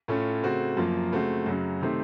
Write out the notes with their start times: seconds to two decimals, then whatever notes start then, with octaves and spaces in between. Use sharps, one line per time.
0.08 A2 A3 C#4 F4
0.43 C#3 A3 C4 F#4
0.77 F#2 F3 A#3 F4
1.12 C#3 A3 C4 F#4
1.46 F#2 C#3 F#3
1.81 C3 D#3 A3 C4